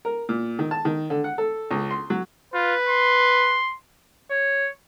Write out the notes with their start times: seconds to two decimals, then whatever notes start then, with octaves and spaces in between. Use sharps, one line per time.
0.05 A#4
0.29 A#2
0.59 D#3
0.71 A5
0.85 D#3
1.10 D3
1.24 F#5
1.38 A4
1.71 C#2
1.90 C6
2.10 F#3
2.54 F4 B4
2.89 C6
4.30 C#5